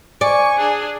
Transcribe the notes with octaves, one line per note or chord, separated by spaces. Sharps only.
D5 G#5 C#6
D4 G#4